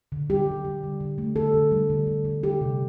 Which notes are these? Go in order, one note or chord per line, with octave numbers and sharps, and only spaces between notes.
D3
G3 G4
G3
G3
D3
D3
A3
D3 A4
D3
G3
D3
D3
D3
G3 G4
C3